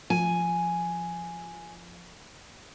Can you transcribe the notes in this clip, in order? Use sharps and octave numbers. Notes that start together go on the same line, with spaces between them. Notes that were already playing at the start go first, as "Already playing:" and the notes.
F3 G#5